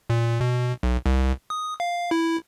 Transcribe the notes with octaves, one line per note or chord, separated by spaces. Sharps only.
A#2
B2
B1
C2
D#6
F5
E4